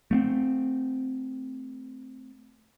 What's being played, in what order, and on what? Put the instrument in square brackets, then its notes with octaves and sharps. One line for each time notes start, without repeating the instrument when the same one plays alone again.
[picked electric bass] A3 A#3 C4